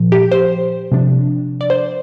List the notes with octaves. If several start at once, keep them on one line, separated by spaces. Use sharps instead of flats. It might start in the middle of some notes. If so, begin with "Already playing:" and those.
Already playing: A#2 F3
G4
C5
C3 F3 D4
D5
C5